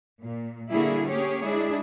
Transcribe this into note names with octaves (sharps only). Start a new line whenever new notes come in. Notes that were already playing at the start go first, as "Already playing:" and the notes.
A#2
D3 G3 A#3 E4 F#4 G#4
A#3 C#4 G4 G#4 C#5
G#3 D4 E4 G#4